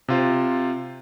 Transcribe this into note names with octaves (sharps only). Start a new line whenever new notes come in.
C3 F4 C5